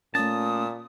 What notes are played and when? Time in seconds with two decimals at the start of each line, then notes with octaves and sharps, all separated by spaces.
0.15 A#2 A3 C#4 A5 D#6